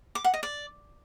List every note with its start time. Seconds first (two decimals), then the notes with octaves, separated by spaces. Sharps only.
0.15 D6
0.24 F#5
0.34 D#5
0.43 D5